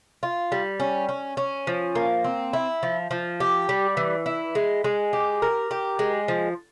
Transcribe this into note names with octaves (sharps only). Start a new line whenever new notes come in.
F4
G3
C#4
C#4
C#4
F3
A#3
C4
E4
F3
F3
G4
G3
E3
E4
G#3
G#3
G4
A#4
G4
G#3
F3